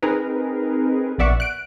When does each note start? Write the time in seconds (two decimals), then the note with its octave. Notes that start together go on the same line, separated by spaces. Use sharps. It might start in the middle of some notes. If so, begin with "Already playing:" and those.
0.02 C4 D#4 G#4 A#4 B4
1.18 A#1 B3 D5 E5 F#5 C#6
1.40 F#6 D7